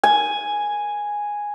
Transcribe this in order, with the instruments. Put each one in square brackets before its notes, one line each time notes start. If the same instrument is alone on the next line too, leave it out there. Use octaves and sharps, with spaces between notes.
[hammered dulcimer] G#5